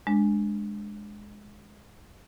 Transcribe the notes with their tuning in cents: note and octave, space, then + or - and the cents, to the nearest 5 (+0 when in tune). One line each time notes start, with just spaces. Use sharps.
G#3 +0 D4 +0